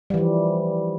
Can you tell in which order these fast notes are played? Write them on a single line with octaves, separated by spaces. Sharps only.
G3 E3 F3